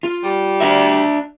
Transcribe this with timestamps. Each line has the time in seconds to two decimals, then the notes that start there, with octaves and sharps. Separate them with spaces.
0.03 F4
0.23 G3
0.60 D4 D5 E5